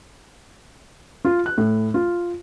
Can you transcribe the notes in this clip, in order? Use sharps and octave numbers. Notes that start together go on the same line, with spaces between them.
F4
F#6
A2
F4